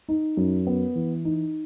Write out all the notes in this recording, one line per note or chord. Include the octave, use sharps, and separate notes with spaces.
D#4
F#2
B3
E3
D#4